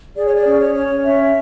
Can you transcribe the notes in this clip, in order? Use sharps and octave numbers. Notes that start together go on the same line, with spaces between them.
G#4 D5
C#5
D5
C#4
C#5
C#5
C#4 E5